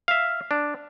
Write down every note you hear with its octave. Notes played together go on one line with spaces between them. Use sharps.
E5 F5
D4